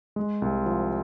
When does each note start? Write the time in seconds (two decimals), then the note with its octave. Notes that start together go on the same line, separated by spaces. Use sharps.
0.16 G#3
0.42 C2
0.66 F3